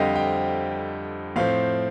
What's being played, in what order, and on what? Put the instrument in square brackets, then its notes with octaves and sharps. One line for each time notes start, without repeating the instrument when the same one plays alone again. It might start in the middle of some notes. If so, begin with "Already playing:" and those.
Already playing: [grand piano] F2 D3 G3 C4 D#5 F5 G5
G5
A2 F3 C4 F5